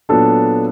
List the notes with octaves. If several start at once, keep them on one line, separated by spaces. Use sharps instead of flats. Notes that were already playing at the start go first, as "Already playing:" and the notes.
A#2 F#3 B3 D4 A4